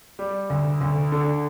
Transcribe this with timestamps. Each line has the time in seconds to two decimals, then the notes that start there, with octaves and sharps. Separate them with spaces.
0.19 G3
0.50 D2
0.81 D2
1.12 D3